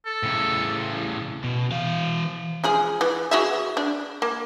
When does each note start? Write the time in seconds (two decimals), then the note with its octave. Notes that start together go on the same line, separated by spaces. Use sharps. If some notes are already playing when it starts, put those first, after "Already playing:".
0.06 A4
0.23 A2 C#3
1.44 B2
1.72 E3 F5
2.64 F3 G#3 G#4
3.01 E3
3.31 F#4 G#4 E5
3.77 D4
4.22 A#3